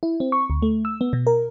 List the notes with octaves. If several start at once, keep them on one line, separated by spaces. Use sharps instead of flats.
E4
C4
C#6
D2
A3
E6
B3
B2
A#4